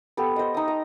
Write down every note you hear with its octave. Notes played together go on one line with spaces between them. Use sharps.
B3 G4 A4
C5 D#5
D#4 D#6
A#5